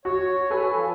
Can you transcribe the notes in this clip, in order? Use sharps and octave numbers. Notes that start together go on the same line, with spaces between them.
F#4 C#5
A4 B4 G#5
F3